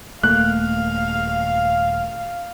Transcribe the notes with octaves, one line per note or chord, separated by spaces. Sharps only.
D#1 A3 A#3 F5 F#6